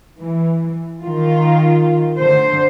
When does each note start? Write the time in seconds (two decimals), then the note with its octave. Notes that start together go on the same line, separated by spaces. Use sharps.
0.19 E3
1.04 D#3 F4
2.18 D3 C5